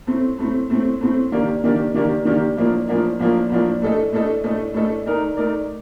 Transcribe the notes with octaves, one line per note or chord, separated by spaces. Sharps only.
A2 A3 C4
A2 A3 C4
A2 A3 C4
A2 A3 C4
D#3 A#3 D4 G4 D5
D#3 A#3 D4 G4 D5
D#3 A#3 D4 G4 D5
D#3 A#3 D4 G4 D5
A2 F3 A#3 D4
A2 F3 A#3 D4
A2 F3 A#3 D4
A2 F3 A#3 D4
A2 A3 D4 A4 D#5
A2 A3 D4 A4 D#5
A2 A3 D4 A4 D#5
A2 A3 D4 A4 D#5
A3 D#4 A#4 D5
A3 D#4 A#4 D5